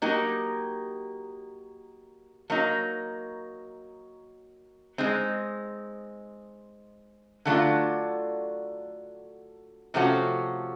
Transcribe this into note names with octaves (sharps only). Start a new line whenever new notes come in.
F#3 A#3 D#4 G4
F#3 A#3 D#4
G#3 C4 D#4
D3 F#3 A3 D4 F4
C3 F3 A3 C#4 F#4